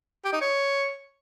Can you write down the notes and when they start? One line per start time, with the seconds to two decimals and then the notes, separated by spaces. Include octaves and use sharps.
0.25 G4
0.33 D#4
0.41 C#5